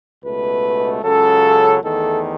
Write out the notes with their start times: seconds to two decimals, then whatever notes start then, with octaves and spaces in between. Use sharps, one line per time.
0.23 C#2 B2 A3 B4
1.03 C#2 C#3 F#3 A4
1.83 E2 D#3 A3 A4